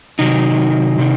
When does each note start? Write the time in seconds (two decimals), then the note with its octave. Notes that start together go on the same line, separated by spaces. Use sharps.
0.19 C3 D#3 F#3 D#4
0.98 C3 D#3